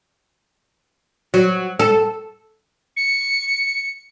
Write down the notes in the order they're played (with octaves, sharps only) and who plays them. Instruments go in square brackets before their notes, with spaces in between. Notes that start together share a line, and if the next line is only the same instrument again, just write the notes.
[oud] F#3
A4
[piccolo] C#7